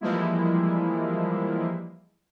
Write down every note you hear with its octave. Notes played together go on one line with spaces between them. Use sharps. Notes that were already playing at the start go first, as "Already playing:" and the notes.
E3 F3 G3 G#3 A#3 E4